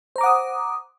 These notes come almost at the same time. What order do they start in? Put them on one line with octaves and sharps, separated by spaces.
C5 A#5 D6 F#5 D#6